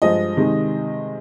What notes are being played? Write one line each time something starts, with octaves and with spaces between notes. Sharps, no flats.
G2 F3 G#3 D#5
C3 D#3 G#3